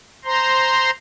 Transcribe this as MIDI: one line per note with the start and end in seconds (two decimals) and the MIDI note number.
0.25 0.90 72
0.25 0.90 82
0.25 0.90 84